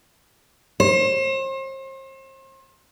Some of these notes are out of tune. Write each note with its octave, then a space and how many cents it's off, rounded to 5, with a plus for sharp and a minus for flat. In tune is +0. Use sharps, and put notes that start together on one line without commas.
C5 +40